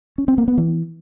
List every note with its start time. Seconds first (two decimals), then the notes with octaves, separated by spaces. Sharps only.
0.18 C#4
0.28 C4
0.38 A#3
0.48 B3
0.58 E3